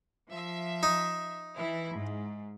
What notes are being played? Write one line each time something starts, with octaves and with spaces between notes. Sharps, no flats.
F3 E5
D#4
E3 E4
G#2